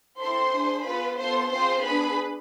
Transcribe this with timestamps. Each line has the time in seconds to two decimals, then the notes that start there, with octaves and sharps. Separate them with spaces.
0.20 C4 E4 A4 C5 C6
0.53 D4 G#4
0.85 B3 F4 G#4 B4 B5
1.18 B3 F4 A4 C5 C6
1.51 C4 F4 G#4 C5 C6
1.83 B3 D4 G#4 B4 B5